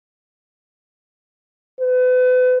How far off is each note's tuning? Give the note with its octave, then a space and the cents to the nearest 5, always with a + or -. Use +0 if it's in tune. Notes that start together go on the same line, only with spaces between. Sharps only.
B4 +35